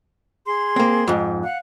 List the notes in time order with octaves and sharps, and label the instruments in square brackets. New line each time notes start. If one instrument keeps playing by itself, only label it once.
[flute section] G#4 C6
[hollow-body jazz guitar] A#3 C4
F2 G#2
[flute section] F5 F#5 F#6